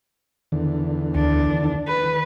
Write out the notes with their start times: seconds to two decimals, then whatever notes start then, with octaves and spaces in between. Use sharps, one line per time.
0.52 E2 D3 D#3
1.15 D2 D4
1.54 D#3
1.88 B4